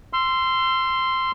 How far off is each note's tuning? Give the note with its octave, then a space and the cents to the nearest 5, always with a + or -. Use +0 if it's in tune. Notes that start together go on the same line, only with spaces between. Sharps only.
C6 -5 E6 +35